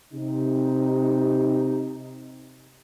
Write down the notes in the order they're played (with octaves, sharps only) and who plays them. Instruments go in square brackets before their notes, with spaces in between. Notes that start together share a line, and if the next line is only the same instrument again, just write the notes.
[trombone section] C3 D#4